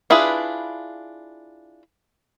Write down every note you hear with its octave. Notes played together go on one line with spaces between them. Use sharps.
D4 E4 F4 G#4 B4